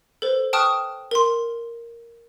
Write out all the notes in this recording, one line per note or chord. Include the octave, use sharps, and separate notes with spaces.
A4 B4 C5
G5 A5 C#6 D#6 F6 F#6
A#4 C6